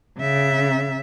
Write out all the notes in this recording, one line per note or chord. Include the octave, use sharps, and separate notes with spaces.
C#3 E5